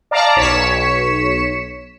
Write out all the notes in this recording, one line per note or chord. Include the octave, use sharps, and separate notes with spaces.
D5 F5 A5 A#5 D6
B1 C#5 B6 C#7 E7